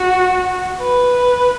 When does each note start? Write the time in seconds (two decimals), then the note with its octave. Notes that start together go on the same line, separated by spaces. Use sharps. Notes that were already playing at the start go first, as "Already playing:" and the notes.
Already playing: F#4
0.81 B4